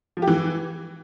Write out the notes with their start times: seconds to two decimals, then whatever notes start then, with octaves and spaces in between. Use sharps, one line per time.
0.17 F3
0.22 G4
0.27 E3